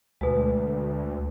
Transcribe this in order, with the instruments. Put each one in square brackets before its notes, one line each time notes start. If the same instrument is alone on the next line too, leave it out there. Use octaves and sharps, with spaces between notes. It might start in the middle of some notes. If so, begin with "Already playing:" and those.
[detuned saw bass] D2 [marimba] B2 G#3